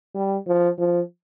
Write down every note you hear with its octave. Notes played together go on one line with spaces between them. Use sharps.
G3
F3
F3